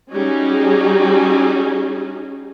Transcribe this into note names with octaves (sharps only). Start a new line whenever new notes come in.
G3 C#4 D#4 F#4 G#4